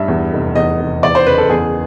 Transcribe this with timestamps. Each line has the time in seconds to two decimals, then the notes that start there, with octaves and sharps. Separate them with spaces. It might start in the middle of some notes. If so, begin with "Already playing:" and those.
Already playing: G2 E5
0.08 E2
0.33 F1
0.55 E2 D#5
0.79 F1
1.03 E2 D5
1.15 C5
1.26 F#1 B4
1.38 A4
1.50 E2 G#4